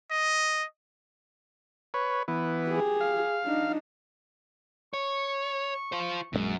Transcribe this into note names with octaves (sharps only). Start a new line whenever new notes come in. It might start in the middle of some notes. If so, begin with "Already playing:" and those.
D#5
B4 C#5
E3 B3
G4 G#4
F5
D4 D#4
C#5 C#6
F4 C5
A#1 F#2 D3 G#3